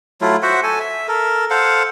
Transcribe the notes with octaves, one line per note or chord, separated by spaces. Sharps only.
F#3 A3 E4 F4
F#4 C5 E5 F#5
A4 G#5
E5
A4 A#4
A4 C5 F5 F#5